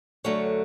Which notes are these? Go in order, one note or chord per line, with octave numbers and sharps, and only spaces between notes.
F#2 D3 F#3 A3 C#5